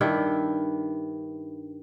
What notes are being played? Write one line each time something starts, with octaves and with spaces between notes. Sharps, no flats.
G2 D#3 D4 E4